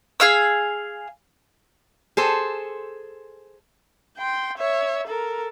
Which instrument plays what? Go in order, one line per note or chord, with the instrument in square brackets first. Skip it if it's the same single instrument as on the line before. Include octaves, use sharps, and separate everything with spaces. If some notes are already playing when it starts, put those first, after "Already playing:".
[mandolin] G#4 F5 E6
[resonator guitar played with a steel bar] G#4 A4 C5
[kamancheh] G5 C6
C#5 E5
A4 A#4